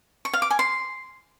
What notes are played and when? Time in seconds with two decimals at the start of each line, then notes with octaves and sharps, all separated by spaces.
0.25 C#6
0.33 F5
0.42 D6
0.50 G#5
0.59 C6